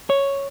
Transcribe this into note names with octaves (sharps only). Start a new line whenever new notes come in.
C#5